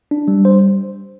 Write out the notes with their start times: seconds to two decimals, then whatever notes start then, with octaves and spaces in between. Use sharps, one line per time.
0.11 D4
0.28 G3
0.45 C5